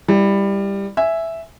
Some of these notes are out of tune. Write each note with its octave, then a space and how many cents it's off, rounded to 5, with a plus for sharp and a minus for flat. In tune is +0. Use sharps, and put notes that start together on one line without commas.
G3 +15 E4 +0
E5 +0 G#5 +0